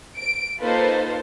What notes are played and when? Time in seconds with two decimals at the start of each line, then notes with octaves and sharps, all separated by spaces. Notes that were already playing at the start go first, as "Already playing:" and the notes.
0.17 D7
0.62 A#3 D#4 F4 A4 B4 C5